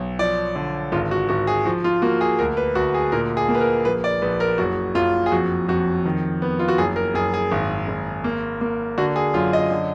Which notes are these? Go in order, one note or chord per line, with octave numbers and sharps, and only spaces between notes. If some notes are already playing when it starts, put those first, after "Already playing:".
Already playing: B1
F3 D5
D3
G#1 F4
F#4
G#1 F#4
G#4
F3 F#4
F4
A#3 F#4
G#4
D2 A#4
B4
D2 F#4
G#4
A#2 A#4
G#4
A#3
B4
A#4
A#1 B4
D5
A#1 B4
A#4
F#1 F#4
F#1 F4
G#4
F2 F#4
F2 F#4
D#3
B3
F4
F#4
F#1 G#4
A#4
F#1 G#4
G#4
G#1
G#1
A#3
A#3
D3 F#4
G#4
F#2 F4
D#5
D3